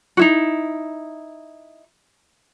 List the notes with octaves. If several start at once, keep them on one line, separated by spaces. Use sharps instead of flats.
D#4 E4 F#4